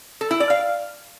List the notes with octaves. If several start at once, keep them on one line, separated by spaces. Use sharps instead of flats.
A4
E4
D5
F5